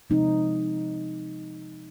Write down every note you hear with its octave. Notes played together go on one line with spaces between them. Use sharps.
C3 F3 G#3 C4 D#4